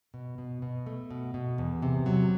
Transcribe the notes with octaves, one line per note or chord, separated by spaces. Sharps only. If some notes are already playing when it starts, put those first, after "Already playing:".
B2
B2
B2
A3
B2
B2
E2
C3
F#3